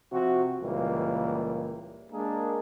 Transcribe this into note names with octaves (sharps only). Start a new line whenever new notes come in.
C3 F3 C4 F#4
C#2 A#2 E3 G3 A#3
G#3 A#3 D4 G#4 A#4